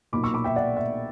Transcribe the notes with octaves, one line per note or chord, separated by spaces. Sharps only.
B1 A#2 A#3 B5 D6
C#6 E6
B5 D6
E5 G5
D5 F#5
E5